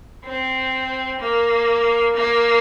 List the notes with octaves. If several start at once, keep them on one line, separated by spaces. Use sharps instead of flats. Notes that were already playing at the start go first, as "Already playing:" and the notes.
C4
A#3
A#3